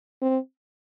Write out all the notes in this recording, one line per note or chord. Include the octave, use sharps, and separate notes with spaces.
C4